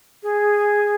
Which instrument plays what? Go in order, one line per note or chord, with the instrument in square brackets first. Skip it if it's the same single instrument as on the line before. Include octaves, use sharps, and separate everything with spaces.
[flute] G#4